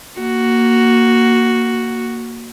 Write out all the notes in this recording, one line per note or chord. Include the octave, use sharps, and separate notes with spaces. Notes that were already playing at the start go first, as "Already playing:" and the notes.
A#3 F#4